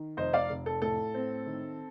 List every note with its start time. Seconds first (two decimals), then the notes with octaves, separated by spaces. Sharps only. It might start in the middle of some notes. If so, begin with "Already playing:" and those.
Already playing: D#3
0.17 F1 C5 D#5
0.33 D5 F5
0.50 F1
0.66 A4
0.82 A2 A4
1.14 C4
1.46 D#3